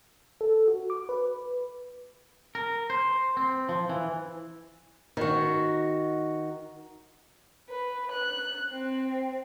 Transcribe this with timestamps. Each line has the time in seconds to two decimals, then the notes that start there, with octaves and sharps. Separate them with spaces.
0.41 A4
0.68 F#4
0.90 D6
1.09 B4
2.55 A#4
2.90 C5
3.37 C4
3.69 F3
3.89 E3
5.17 D#3 F#4
7.70 B4
8.12 F#6
8.73 C4